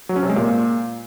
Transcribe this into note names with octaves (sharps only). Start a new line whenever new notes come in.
F#3
C#4
C3
G#3
A#2